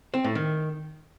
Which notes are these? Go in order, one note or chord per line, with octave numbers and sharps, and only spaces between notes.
C4
A2
D#3